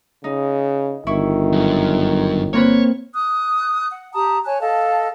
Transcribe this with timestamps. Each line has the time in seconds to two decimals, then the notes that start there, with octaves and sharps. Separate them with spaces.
0.24 C#3 D#4
1.07 G1 D#3 E4 C#6
1.52 F#2
2.53 A#3 C4 B4 C#5
3.13 D#6 F#6
3.91 F#5
4.13 G4 A5 A#5 D#6
4.45 C#5 G#5 A5 F#6
4.60 A4 D#5 F5 A5